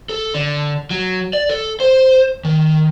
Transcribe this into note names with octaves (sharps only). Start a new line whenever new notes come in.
A4
D3
F#3
D5
A4
C5
D#3